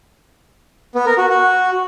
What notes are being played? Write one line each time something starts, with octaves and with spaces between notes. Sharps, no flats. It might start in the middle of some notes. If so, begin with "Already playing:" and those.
B3
A#4
F#4
F#4